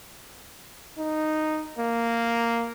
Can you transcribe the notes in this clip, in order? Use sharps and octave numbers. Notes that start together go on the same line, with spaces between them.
D#4
A#3